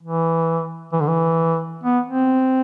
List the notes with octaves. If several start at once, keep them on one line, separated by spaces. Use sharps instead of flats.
E3
E3
D3
E3
B3
C4